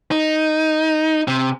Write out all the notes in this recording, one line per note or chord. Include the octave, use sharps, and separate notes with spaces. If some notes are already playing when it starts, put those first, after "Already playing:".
D#4
C3